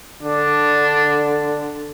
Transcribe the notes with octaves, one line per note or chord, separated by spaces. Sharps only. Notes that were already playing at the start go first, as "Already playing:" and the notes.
D3 D4